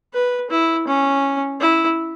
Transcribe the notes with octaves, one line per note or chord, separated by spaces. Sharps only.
B4
E4
C#4
E4